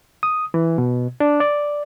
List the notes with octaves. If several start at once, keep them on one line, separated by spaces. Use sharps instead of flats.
D#6
E3
B2
D4
D5